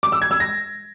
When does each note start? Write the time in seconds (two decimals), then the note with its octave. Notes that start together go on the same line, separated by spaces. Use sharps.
0.03 D6
0.12 E6
0.22 G#6
0.31 E6
0.40 A#6